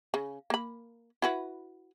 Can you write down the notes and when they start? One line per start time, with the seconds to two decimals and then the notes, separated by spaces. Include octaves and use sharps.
0.14 C#3
0.50 A#3 B5
1.22 E4 F#4 B4